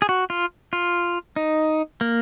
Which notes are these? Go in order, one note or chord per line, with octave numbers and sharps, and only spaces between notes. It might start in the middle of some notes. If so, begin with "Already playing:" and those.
G#4
F#4
F4
F4
D#4
A#3